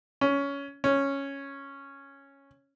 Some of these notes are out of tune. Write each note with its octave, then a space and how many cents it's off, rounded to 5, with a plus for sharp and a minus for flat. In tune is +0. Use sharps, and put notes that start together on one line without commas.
C#4 +15
C#4 -5